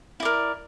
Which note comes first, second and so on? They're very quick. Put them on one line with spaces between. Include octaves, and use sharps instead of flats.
E4 D5 A#4